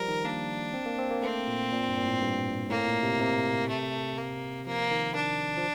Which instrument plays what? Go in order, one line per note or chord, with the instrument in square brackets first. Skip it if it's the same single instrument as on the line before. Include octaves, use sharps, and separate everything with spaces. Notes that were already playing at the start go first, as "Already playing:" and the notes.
Already playing: [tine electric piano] F3 G3 [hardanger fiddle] A#4
[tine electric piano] D#3
[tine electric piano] A#3 [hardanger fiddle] D4
[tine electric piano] C4
A#3
C4
A#3
[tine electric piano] A3 [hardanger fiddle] C4
[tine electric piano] A#2
A#2
G2
A#2
A2
G2
[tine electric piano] A2 [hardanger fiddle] A#3
[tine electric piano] A#2
C3
C3
[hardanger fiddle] A3
A#3
[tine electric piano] F3 [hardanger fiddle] A#3
[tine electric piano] D#3
[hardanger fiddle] D4
[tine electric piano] F3